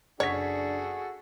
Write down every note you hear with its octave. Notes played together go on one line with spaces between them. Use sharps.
F#1 D4 F#4 G#4 A4 C#5 F#5 B6